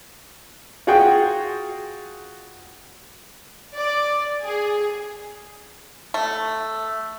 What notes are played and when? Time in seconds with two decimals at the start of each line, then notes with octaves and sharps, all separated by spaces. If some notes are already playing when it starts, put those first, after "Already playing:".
0.87 F4 F#4 G#4 F#5 G5
3.75 D5
4.43 G#4
6.14 A3